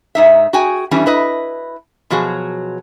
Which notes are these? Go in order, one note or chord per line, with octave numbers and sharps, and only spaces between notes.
G#2 D#4 E5
F#4 G#4 G5 G#5
E3 G3 C#4 D4
E4 B4 D#5
B2 F3 F#3 F#4 G#4